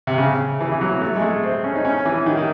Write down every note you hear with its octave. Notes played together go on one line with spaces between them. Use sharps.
C3
C#3
E3
E3
F#3
A3
G#3
A3
C4
C#4
D#4
C#4
E3
D#3
D#3